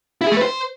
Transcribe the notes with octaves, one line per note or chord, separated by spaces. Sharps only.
E4
G#4
A3
B4
C5